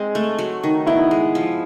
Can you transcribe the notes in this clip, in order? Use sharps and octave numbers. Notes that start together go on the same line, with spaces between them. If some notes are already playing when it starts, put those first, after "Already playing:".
Already playing: G#3 C4
A3
F#3
D#3
B3 E4
G#3
F3